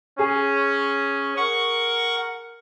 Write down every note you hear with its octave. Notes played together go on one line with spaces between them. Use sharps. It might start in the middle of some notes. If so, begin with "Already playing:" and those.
C#4 G#4
A#4 F#5 C#6